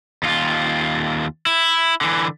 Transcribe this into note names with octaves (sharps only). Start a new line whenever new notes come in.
D#2 F4
E4
D3 E3